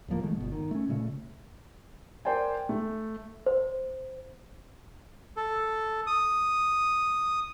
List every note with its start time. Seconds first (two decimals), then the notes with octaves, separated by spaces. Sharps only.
0.08 D1 A2 F3 A#3
0.23 D#3 G#3 A3
0.37 G1 B2
0.52 D#3
0.71 A3 C#4
0.89 A#2 C#3 A3
2.25 A#4 C5 D5 G5 G#5
2.69 A3
3.46 C5
5.37 A4
6.07 D#6